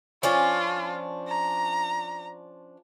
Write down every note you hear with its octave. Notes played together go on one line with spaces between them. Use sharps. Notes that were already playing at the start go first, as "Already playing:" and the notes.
F3 C#4 D4 F4
A#5